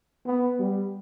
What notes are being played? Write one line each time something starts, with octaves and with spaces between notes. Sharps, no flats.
B3
G3